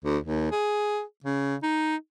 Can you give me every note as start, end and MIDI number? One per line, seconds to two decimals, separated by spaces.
0.04 0.18 38
0.23 0.49 39
0.51 1.02 68
1.24 1.55 49
1.62 1.95 63